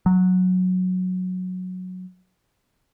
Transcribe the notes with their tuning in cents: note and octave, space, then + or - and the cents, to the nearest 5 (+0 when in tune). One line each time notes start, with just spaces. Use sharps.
F#3 -10